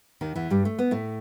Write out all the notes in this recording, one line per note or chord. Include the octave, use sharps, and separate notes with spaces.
D#2 D#3
E2 E3
G2 G3
A3
B3
A2 A3